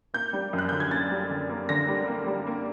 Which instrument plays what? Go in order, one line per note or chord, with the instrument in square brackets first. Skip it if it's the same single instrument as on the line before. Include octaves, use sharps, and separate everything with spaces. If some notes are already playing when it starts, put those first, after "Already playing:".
[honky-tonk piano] A#3 G6
G3
F#2
F#6
D3 G6
G#6
A#3 A6
G3
D3
A#3
D3 A#6
G3
A#3
G3
A#3